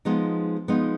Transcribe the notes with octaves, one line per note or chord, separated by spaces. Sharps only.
F3 G#3 B3 D#4
F3 G#3 B3 D#4